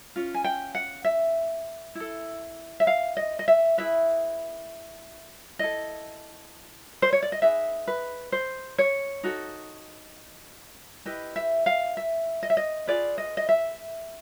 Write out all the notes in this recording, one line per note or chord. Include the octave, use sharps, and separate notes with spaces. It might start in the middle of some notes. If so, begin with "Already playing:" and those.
C#4 F4
G#5
G5
F#5
E5
E4 A4
E5
F5
D#5
D#5
E5
E4 G#4 B4 E5
E4 A4 D#5
C5
C#5
D5
D#5
D#4 G#4 B4 E5
B4
C5
C#5
D#4 F#4 A4
E4 G4 B4 D#5
E5
F5
E5
D#5
E5
D#5
F4 G#4 B4 D5
D#5
D#5
E5